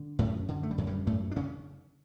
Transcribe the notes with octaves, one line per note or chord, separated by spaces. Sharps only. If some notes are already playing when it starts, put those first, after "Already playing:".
Already playing: D3
F#2 A2 A3
D3
A3
G3
F#2 F#3
G2 G3
F#2 A2 A3
D4
C#3 C#4